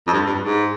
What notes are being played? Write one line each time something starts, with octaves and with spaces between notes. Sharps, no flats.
F2
G2
G2
G#2